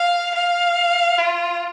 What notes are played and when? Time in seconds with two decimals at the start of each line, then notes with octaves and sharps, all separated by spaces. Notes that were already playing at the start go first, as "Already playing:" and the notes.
Already playing: F5
0.35 F5
1.18 F4